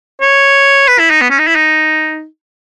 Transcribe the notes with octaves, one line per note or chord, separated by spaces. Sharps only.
C#5
B4
E4
D#4
B3
C#4
D#4
E4
D#4